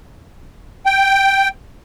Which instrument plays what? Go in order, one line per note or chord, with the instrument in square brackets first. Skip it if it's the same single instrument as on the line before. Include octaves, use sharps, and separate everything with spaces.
[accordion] G5